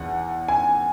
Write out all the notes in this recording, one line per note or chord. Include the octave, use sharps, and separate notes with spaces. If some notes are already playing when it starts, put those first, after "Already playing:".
Already playing: E2 F#5
G#5